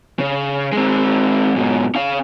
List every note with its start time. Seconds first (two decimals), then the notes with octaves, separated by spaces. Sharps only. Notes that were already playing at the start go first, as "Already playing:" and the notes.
0.19 C#3
0.72 G#3 C4
1.56 G#2 B2
1.95 C#4 F5